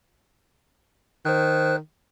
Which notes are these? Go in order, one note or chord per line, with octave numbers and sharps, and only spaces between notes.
D#3 C5 F#6